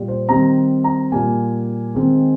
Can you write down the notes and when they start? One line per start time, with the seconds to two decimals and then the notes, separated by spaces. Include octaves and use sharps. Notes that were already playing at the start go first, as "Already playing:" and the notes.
Already playing: A#2 G3
0.08 C5
0.29 D#3 G3 C4 A#5
0.84 A#5
1.12 A#2 G3 A#3 G#5
1.95 D#3 G#3 C4